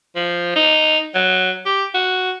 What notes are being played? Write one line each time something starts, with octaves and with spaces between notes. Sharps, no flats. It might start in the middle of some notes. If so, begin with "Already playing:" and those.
F3
D#4
F#3
G4
F#4